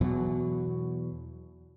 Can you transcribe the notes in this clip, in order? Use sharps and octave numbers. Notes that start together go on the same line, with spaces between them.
E2 B2 F#3